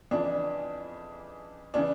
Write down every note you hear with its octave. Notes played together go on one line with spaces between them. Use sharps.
F2 C#3 E3 D4
C#3 E3 D4